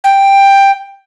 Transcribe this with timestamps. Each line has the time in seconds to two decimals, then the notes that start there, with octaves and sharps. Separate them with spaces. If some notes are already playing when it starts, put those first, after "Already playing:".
0.04 G5